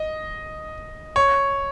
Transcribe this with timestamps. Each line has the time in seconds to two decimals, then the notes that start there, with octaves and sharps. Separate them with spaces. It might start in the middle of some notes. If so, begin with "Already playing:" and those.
Already playing: D#5
1.16 C#5